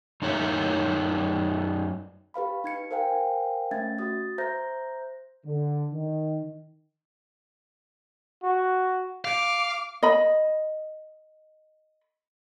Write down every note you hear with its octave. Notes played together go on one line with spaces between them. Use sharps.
F#2 D#4 A#4 C#5 E5 F5
G4 B4 F5 B5
D#4 G#6 C#7
A#4 C5 F5 G5 G#5
A3 C#4 E5 G#6 A6
F#4 D#6 A6
C5 E5 A#5 G6 A#6
D3
D#3
F#4
F5 D6
D#5 B5